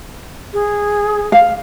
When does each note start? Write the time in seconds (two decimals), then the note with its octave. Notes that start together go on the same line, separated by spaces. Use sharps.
0.53 G#4
1.32 F5